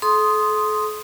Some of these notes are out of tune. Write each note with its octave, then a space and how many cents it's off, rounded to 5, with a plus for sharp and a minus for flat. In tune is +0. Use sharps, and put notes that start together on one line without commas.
A4 -40 C6 +0 D#6 +0